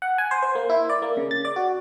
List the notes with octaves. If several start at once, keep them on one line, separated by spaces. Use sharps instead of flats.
F#5
G#5
C5
C5
A#3
E4
D5
A#3
C#3
A6
D5
F#4